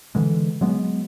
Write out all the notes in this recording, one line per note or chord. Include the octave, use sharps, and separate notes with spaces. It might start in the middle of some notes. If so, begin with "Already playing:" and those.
D3 E3 G#3
F#3 G#3 B3